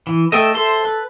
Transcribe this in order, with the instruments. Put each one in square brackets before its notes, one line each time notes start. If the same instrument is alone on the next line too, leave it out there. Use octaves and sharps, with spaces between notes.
[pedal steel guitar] E3
[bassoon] A3 [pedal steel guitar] D#5 E5 G5
[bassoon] A4 [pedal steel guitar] C5 E5 C6
[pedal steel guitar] B4